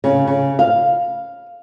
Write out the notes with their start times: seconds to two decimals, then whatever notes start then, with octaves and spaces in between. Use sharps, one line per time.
0.04 C#3
0.27 C#3
0.59 F5